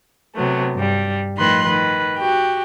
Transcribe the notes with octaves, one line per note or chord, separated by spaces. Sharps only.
C3 F#3 A3 B3
G2 G3
A2 D#3 F3 B4 C6 F#6
D#3 B4
F#4 G4 G5